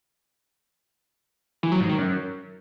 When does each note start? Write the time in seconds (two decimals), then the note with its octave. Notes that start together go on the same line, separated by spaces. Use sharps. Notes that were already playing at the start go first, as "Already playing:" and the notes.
1.63 E3
1.72 F#3
1.81 G#2
1.89 D#3
1.98 F#2